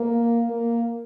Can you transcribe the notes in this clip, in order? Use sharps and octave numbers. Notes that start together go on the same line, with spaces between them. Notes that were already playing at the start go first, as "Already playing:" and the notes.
Already playing: A#3
A#3